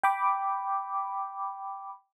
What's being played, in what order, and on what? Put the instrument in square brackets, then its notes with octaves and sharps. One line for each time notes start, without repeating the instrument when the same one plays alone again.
[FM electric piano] G5 B5 D6